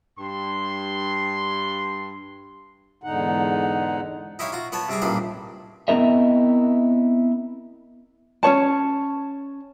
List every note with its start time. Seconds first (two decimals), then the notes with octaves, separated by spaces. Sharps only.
0.18 G2 C6
3.03 E2 G#2 D3 D#4 F#5
4.39 D#4 E4 G4 C#5 F5
4.52 F4 F#4 A#5
4.72 B3 B4 C#5 A5
4.89 C3 G3 C4 G#4 D6
5.02 A1 G2 A#2 D#4 B4 F5
5.88 B3 C4 E4 A#4 D#5 E5
8.43 C#4 G#4 C#5 A5